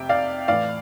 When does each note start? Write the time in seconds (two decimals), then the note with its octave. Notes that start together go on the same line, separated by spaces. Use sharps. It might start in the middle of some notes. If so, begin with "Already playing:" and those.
Already playing: F2 C3 E5 G5
0.09 D5 F5
0.48 A2 E3 D5 F5